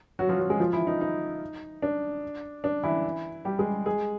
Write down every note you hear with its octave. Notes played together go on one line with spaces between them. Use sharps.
F#3 F#4
F3 F4
F#3 F#4
G#3 G#4
F3 F4
E3 E4
D#4
D#4
D4
D4
E3 E4
G3 G4
G#3 G#4
G#3 G#4